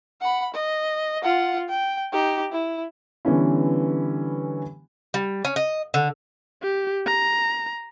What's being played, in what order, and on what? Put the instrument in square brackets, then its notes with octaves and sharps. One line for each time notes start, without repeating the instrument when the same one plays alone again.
[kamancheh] F#5 B5
D#5
F4 F#5
G5
D#4 G4
E4
[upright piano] D3 E3 G3 B3 C#4 E4
[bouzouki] G3
C#4
D#5
D3
[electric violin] G4
A#5